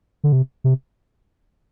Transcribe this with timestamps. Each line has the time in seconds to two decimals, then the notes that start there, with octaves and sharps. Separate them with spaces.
0.24 D3
0.32 C3
0.64 C3